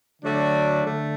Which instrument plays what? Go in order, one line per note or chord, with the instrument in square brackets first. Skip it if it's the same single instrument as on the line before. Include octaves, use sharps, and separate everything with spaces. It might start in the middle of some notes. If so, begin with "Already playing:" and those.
[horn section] D3 F#3 A3 D4 F#4
D3 A3